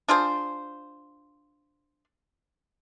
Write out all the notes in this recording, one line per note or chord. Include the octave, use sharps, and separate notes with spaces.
D4 F4 G#4 C5